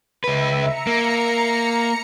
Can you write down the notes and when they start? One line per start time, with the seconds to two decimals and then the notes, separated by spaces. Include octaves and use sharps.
0.24 C#2 B4 E5
0.57 A#5 C#7
0.87 A#3